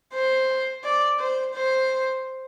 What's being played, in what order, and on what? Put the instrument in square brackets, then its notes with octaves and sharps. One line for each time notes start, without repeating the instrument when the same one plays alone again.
[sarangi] C5
D5
C5
C5